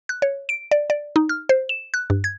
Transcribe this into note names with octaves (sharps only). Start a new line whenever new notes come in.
F#6
C#5
D7
D5
D5
D#4
F6
C5
E7
F#6
G2
G#6